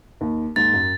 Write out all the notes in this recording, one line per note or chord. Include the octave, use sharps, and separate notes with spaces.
D#2
D#2 G#2 A6
F#2